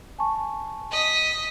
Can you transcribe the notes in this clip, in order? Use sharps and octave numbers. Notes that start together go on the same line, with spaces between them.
G#5 A5 C#6
D#5 B6